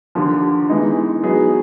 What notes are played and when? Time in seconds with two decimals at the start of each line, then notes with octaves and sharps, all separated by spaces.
0.15 D#2 D3 F3
0.69 E3 G#3 B3 D#4
1.23 F#3 B3 D#4 G#4